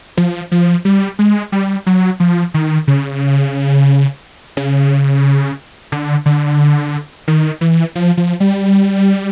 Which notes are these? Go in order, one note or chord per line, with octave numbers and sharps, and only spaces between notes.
F3
F3
G3
G#3
G3
F#3
F3
D#3
C#3
C#3
D3
D3
D#3
E3
F3
F3
G3